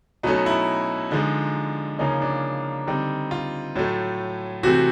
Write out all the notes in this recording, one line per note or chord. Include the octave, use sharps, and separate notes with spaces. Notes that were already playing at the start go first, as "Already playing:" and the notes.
B2 F#3 A3 C#4 D#4
E4
D3 F3 G#3 D#4
C#3 F3 A#3 C#4 D#4
D4
D3 G3 C4 D#4
F4
A2 F#3 A3
C3 E3 A3 C4 F#4